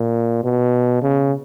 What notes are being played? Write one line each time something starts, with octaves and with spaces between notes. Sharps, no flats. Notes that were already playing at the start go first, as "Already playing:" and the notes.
Already playing: A#2
B2
C#3